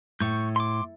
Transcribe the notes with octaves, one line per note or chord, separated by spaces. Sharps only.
A2 C#6 G6
C6 D6